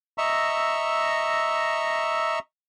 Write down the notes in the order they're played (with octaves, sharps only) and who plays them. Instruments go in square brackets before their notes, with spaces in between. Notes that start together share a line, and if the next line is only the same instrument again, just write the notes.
[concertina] D#5 E5 A#5 C#6 E6